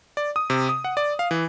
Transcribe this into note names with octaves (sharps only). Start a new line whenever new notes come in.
D5
D#6
C3
D#6
F#5
D5
F5
E3